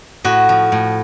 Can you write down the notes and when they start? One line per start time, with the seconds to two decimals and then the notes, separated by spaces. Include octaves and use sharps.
0.24 A2 F#4
0.49 F3
0.72 A2